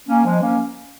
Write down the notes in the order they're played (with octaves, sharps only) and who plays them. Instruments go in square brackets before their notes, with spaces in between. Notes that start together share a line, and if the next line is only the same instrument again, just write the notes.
[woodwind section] A#3 C#4
F3 G#3
A#3 C#4